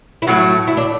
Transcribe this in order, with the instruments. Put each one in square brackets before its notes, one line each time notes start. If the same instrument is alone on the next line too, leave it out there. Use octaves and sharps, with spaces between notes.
[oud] E4
[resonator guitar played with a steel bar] A2 F#3 A3 [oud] F#4
[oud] E4
D4